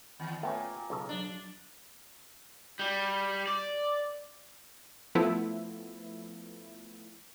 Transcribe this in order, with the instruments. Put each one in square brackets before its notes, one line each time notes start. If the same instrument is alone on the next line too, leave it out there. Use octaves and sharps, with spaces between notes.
[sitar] E2 [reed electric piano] D#3
[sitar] A#2 [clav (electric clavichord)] A3 B3 C#4 [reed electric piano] G5 G#5
[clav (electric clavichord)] B1 C#3 A4
[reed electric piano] F#3 D6 [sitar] D4
[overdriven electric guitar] G3
D5
[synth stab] F3 A3 B3 E4